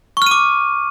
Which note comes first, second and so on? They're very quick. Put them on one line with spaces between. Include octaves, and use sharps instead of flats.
C#6 F6 D#7 D6